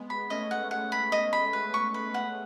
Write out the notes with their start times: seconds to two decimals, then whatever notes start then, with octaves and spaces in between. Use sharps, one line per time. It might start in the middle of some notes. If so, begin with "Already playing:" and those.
Already playing: G#3 B3
0.10 B5
0.30 A3 C#4 D#5
0.51 F#5
0.71 A3 C#4 F#5
0.92 B5
1.12 D#5
1.33 B5
1.53 B4
1.74 C#6
1.94 B4
2.14 F#5